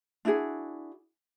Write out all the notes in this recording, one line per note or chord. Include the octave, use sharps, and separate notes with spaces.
D4 E4 F#4 G#4